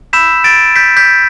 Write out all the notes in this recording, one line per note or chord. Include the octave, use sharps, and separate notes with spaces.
B5 E6 G6 B6 E7
A6 D7
G6 B6
G6 B6